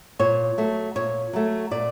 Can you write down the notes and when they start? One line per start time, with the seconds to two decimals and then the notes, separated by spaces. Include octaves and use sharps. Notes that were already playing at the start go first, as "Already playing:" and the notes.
0.19 A#2 C#5
0.58 F#3 A3
0.95 A#2 C#5
1.33 F#3 A3
1.71 A#2 D5